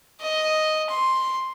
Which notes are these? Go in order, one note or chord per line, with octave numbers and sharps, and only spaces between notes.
D#5
C6